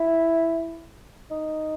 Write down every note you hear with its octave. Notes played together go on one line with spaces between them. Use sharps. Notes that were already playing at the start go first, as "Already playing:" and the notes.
Already playing: E4
D#4